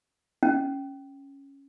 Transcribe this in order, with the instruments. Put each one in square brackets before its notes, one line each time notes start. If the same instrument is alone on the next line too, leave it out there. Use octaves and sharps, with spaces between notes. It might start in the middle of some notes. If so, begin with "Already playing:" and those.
[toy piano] C#4